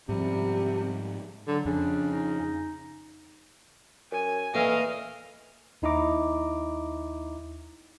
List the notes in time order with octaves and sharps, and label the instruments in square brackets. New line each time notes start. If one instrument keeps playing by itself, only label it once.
[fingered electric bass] G#2 F3 [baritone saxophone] C3 [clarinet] G3
[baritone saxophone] D3 [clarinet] F#3
[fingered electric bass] F2 [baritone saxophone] C#3 [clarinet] D4
[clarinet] D#4
[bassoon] F#2 [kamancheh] G#5
[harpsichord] A#2 E3 [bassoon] A3 [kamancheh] D#5 F5
[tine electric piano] D#2 D#4 E4 D#5 A#5 D6